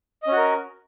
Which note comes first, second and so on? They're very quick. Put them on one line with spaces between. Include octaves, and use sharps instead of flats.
D#5 C#4 F#4 A#4